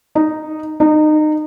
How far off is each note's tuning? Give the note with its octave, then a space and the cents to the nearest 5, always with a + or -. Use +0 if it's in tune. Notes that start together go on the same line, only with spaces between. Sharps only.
D#4 -10
D#4 -25